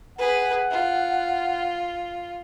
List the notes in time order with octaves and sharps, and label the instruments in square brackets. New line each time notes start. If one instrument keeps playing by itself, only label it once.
[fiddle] G#4 B4 [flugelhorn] F#5
[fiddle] F4